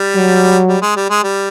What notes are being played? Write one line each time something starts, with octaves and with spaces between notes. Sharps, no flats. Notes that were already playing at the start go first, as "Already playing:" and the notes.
Already playing: G3
F#3
G3
G#3
G3
G#3
G3